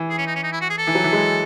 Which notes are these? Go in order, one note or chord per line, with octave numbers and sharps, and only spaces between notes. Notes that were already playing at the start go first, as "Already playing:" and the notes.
Already playing: E3
G#4
C#4
D#4
C#4
D#4
E4
F#4
G#4
A4
E3
F#3
E3
G#3